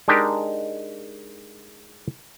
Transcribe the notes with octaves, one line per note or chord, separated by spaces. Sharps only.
G#3 D4 D#4 G4 A#4